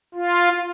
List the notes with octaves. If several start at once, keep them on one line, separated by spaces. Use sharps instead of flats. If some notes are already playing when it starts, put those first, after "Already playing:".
F4